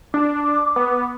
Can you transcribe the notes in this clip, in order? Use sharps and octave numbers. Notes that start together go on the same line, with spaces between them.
D4 D6
B3